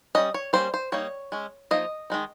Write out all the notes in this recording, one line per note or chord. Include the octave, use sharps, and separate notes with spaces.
G3 C#4 D#5
C#5
G3 A#3 C#4 C5
C5
G3 A#3 D#4 C#5
G#3 C#4
F3 A#3 D#4 D#5
D#3 G#3 D#4